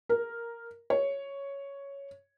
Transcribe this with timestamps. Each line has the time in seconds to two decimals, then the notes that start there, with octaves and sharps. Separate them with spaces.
0.09 A#4
0.90 C#5